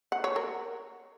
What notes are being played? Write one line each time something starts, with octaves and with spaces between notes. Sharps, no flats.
F#5
C#5
A#4